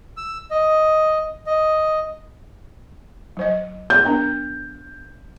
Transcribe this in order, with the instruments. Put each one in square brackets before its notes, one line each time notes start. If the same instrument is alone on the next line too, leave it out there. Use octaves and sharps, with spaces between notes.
[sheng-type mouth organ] E6
D#5
D#5
[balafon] F#3 C5 D#5
[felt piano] G6
[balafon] B3 D4 A#4